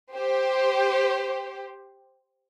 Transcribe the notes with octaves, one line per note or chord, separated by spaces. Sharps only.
G4 C5